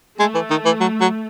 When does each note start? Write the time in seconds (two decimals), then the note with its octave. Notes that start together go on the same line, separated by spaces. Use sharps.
0.19 G#3 A3
0.35 E3
0.50 D#3
0.66 E3
0.81 F#3
1.01 F#3